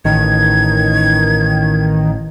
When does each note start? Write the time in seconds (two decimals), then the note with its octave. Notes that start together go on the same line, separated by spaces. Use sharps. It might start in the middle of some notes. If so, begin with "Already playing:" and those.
0.05 A1 D#3 G#6